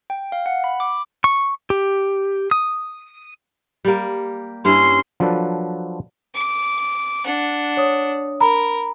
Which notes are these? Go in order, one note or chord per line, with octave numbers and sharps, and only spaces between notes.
G5
F5
F#5
B5
D6
C#6
G4
D#6
G3 A#3
G2 C#4 E4 C6
F3 F#3 D4 A4 B4
D6
D4 F#5
C#5 D#6
A#4 A#5 B5